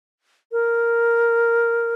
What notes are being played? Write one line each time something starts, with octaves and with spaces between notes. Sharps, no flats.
A#4